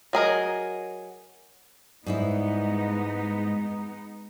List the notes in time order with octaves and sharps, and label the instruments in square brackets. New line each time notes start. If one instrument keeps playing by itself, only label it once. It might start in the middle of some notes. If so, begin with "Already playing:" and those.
[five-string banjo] F#3 G#4 A#4 D#5
[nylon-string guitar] G#2 G3 E4 [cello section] G#3 B3 D#4